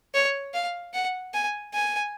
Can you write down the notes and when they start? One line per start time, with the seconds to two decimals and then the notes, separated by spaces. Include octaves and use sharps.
0.14 C#5
0.54 F5
0.94 F#5
1.34 G#5
1.74 G#5